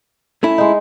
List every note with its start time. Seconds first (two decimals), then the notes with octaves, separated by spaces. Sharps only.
0.43 A3 C#4 E4
0.58 G#3 D#4